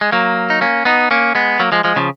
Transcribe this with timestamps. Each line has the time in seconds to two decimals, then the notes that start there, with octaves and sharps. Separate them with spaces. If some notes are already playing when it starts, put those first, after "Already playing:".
0.01 G#3
0.12 F#3 A#3
0.50 D#4
0.61 A#3 C#4
0.85 B3 D#4
1.11 A#3 C#4
1.35 G#3 B3
1.60 F#3 A#3
1.72 F3 G#3
1.84 F3 G#3
1.96 C#3 F3